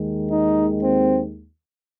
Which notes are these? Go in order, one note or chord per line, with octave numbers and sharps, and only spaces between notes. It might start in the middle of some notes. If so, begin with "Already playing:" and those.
Already playing: D#2 D#3 G#3
D#4
C4